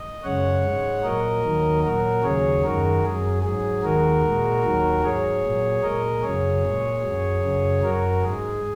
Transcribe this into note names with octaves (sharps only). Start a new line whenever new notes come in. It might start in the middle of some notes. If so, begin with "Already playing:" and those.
Already playing: D#5
F#2 C#3 G#3 C#5 F#5
G#2 G#3
A#2 F#3 A#4 D#5
D#2 D#3 F#3
A#2 F#3 F#4 A#4
D#2 C#3 F#3 G#4 C#5
F#2 D#3 G#3 F#4 A#4
F#2 F#3 G#4
G#2 F#3 G#4
D#2 D#3 G#3 F#4 A#4
A#2 G#3
D#2 D#3 F#3
G#2 F#3 G#4 C#5
A#2 F#3
A#2 G#3 A#4 D#5
F#2 C#3 F#3 G#4 C#5
A#2 G#3
F#2 F#3
F#2 C#3 F#3
F#2 F#3 F#4 A#4
G#2 G#3 G#4